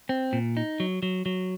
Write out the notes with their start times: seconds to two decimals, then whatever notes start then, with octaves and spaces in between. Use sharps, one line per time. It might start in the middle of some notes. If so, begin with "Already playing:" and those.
0.09 C4
0.33 A#2
0.57 D#4
0.80 F#3
1.03 F#3
1.26 F#3